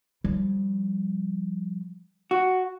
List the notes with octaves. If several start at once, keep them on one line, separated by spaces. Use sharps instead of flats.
F3 G3
F#4